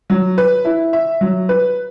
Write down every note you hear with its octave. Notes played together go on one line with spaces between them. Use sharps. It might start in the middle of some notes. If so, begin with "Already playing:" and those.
F#3
B4
E4
E5
F#3
B4